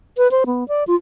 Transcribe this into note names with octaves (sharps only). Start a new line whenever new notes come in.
B4
C5
B3
D5
F4